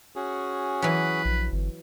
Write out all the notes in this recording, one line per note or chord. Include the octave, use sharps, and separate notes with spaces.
C#4 F#4 G#4
E3 F#3 B4
A#1
G1